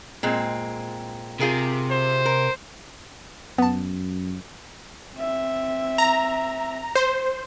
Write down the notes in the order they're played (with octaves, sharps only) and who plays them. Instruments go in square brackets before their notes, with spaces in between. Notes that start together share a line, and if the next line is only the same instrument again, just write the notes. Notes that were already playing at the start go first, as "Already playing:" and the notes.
[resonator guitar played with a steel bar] A#2 G#3 C4
[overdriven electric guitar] C3 [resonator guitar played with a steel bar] F4 G#4 A#4
[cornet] C5
[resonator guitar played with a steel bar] A#4
[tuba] F#2 [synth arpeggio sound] B3 A5
[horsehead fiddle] C4 E5
[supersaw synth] A#5
C5